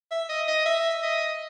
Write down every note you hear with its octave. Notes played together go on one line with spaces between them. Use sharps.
E5
D#5
D#5
E5
D#5